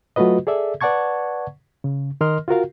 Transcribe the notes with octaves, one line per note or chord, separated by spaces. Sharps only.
F#3 A3 F4 F#4 B4 D#5
G#4 A4 D5 E5
B4 D5 F#5 A5 C#6 G#6
C#3
D#3 A#4 D#5 C6 F6
F4 F#4 A#4 F5